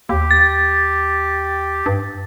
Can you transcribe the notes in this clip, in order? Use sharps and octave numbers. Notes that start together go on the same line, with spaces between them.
D#2 G4
A6
G2